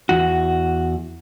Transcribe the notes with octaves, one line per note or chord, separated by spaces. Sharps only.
E2 F#4